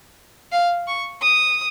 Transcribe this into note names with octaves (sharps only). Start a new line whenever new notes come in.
F5
C#6
D#6